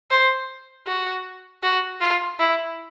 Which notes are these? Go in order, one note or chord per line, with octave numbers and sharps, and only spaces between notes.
C5
F#4
F#4
F4
E4